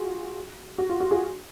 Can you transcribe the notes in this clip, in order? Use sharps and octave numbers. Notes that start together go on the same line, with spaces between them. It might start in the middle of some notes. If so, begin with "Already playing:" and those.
Already playing: F4 F#4 G#4
F#4
F4
F#4
F4 G#4